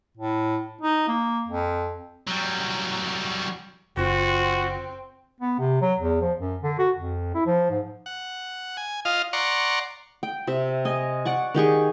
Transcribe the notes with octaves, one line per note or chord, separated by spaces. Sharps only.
A2
D#4
A#3
F2
F#3 G3
F#1 C4 F4 F#4
B3
C3
F#3
E2
F3
F#2
D3
F#4
F2
E4
F3
G#2
F#5
G#5
F4 D#5 F5
D5 F#5 A#5 C6 C#6
G5
C3 E5
D#5 G#5
D5 F#5 C#6
D#3 G4 G#4 C#6